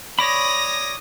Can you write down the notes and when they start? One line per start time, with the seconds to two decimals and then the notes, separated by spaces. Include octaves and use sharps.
0.19 C#5 D5 B5 D#6 A#6